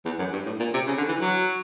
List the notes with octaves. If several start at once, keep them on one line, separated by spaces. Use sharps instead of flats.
E2
F#2
G2
A2
A#2
C3
C#3
D3
E3
F#3